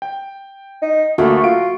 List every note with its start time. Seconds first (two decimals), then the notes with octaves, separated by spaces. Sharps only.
0.02 G5
0.82 D#4
1.18 D2 A3 A#3 F#4 A4
1.44 F4 D7